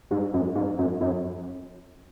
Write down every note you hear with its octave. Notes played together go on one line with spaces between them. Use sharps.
G#2
F#2
G#2
F#2
F#2